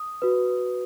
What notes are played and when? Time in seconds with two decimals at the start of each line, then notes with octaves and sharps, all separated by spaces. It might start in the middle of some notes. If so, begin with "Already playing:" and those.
Already playing: D#6
0.22 F#4 B4